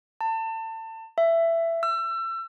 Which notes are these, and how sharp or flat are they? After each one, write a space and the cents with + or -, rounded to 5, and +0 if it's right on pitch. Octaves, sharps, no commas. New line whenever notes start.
A5 +30
E5 +15
E6 +30